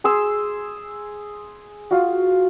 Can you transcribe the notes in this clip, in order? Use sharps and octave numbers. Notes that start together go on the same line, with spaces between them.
G#4 C6 E6
F4 F#4